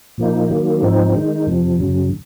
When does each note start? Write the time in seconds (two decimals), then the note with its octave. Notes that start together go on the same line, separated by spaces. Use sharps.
0.18 A#2 F3 A#3 D#4
0.50 D#3 F#3 A#3
0.82 G#2 F3 C4 D#4
1.15 D#3 G#3 D#4
1.47 F2 C3 F3
1.79 F#2 C#3 F#3